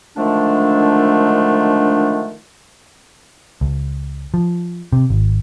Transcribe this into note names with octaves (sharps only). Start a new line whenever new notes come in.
D3 D#3 F3 G#3 A3 D4
C#2
F3
C3
G#1